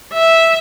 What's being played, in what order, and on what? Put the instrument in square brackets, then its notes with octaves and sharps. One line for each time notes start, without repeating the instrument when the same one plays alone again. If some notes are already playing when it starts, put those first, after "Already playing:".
[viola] E5